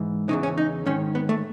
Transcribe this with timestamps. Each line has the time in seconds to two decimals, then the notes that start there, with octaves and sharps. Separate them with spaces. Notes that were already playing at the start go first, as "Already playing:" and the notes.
Already playing: G#2 E3
0.29 E2 C#3 E3 D#4
0.43 C#4
0.57 D#4
0.86 G#2 D#3 C#4
1.15 B3
1.29 A3